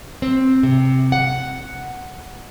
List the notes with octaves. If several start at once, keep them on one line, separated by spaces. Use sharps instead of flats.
C4
C3
F#5